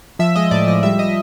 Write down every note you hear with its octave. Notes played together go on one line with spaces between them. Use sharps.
F3 E5
G#3 D#5
A2 D5
F3 D#5
G3 E5
D#5